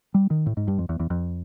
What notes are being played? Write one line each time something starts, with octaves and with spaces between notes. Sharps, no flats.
G3
D#3
A2
G#2
G2
F2
E2
E2
F2